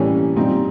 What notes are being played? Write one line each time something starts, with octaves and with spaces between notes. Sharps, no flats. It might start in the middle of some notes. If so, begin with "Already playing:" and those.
Already playing: A2 E3 G3 A#3 C#4
A#2 G3 C4 D#4